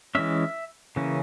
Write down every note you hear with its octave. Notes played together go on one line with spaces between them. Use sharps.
E3 G#3 C#4 E5
C#3 E3 A#3 C#4